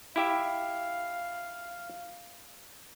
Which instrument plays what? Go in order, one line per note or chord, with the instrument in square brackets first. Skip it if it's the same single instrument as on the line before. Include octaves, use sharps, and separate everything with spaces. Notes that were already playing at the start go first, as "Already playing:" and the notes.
[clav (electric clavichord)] E4 G4 E5 [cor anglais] F5